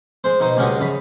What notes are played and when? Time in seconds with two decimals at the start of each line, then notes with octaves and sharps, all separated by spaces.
0.24 G#3 C5
0.40 B2 D#4 C5
0.57 C#2 G3 G#3 C#4 F#4 D#5
0.80 F#2 C#3 B5